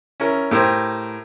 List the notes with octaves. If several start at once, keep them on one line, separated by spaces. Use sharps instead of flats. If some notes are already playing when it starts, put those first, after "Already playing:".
C#4 E4 A#4
A2 G4 A#4 C5